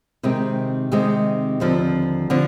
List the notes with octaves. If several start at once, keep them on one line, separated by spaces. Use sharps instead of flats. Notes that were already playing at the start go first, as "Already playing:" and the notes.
C3 D#3 G#3 C4
C3 D#3 G#3 C4
D#2 D3 F3 C4
D3 F3 C4